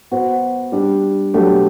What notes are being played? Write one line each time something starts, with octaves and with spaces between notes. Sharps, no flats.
B3 F#4 C5
G3 D4 G4
B2 F#3 A3 D4 G4